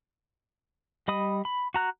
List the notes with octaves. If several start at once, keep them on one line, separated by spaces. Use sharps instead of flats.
G3 D#5 B5 D#6
B5
F#4 A#5 F#6